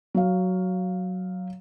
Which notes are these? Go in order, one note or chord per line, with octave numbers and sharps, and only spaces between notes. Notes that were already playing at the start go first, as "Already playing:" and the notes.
F#3 F5